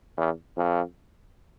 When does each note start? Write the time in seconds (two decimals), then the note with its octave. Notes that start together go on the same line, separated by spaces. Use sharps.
0.17 E2
0.57 F2